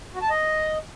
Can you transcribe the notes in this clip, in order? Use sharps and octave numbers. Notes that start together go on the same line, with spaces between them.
F#4
A5
D#5